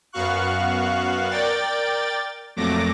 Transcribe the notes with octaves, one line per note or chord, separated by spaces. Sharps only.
F#2 B3 F#4 F5 C#6 F#6
A#4 D5 G5 A6
F2 A#2 F#3 A3 D6 A#6